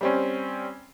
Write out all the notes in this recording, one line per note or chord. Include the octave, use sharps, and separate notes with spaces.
G3 C4 C#4